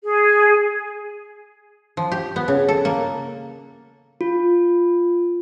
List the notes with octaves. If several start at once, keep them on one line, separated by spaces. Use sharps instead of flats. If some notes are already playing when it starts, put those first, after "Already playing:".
G#4
F3
G4
B3
C#3
A4
A#3
F4